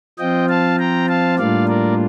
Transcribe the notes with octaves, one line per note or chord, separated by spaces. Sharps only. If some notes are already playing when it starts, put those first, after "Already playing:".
F3 C4 F4 D#5 G5
F5 A5
G5 A#5
F5 A5
A2 G3 A#3 D4 F4 D5 F5
A#4 D5